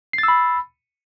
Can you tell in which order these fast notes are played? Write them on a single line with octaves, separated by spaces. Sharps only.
C7 A6 E6 B5